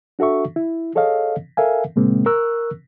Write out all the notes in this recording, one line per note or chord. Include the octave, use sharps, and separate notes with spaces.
D4 F#4 A4 E5 C#6
E4
G#4 A4 C#5 D#5 F5
A4 A#4 E5 F5 G#5
A#2 C#3 G#3 A#3 C4
A#4 C#6 E6 F#6